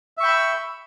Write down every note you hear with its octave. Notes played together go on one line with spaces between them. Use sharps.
E5 G5 B5 C#6 E6